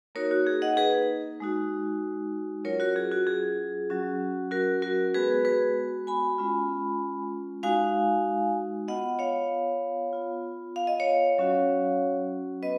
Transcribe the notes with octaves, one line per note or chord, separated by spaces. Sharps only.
A#3 D#4 F#4 A#4 C#5
F#4
G#4
D#5 F#5
G#4 B4
G#3 D#4 F#4
F#3 C#4 F4 A#4 C#5
F#4 A#4
G#4
F#4
G#4
F#3 C#4 F#4
F#4 A#4
F#4 A#4
G#3 B3 F#4 G#4 B4
G#4 B4
G#5 B5
G#3 C#4 F4
G#3 D#4 F#4 F5 G#5
B3 F4 D#5 F#5
C#5 F5
B3 F4
F5
D#5
C#5 F5
F#3 C#4 F#4
B3 B4 D#5